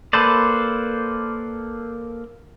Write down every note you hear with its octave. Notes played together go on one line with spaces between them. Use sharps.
A#3 A4 B4 C5 D5